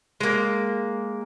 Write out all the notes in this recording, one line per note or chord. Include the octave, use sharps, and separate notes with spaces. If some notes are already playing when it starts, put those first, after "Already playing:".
G#3 A#3